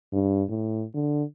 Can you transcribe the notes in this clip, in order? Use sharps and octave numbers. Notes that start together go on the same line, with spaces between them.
G2
A2
D3